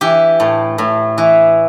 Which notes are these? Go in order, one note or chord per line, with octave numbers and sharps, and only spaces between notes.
E3 G4
A2
A2
E3